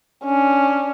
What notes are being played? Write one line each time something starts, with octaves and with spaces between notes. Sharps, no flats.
C#4 D4